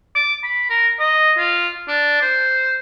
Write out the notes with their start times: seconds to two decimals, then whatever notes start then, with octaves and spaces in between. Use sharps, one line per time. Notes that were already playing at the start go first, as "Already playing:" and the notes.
0.15 D6
0.43 B5
0.70 A#4
0.99 D#5
1.38 F4
1.88 D4
2.21 C5